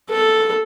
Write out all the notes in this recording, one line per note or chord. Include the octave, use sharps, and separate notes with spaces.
A4